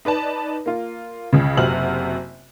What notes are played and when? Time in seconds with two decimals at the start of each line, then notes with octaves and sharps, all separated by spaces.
0.05 D#4 B4 D5 A5
0.66 A#3 F4
1.33 C#2 C#3
1.57 F#1 C3 C4 F#4 F6 F#7